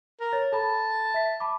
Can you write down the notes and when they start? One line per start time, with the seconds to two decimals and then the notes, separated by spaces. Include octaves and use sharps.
0.20 A#4
0.33 C#5 A6
0.53 A4 A5 B5
1.14 E5 B6
1.40 A5 B5 D6